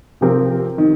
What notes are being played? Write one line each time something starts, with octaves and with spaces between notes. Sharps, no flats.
C3 F3 C4 G4 A#4
D#3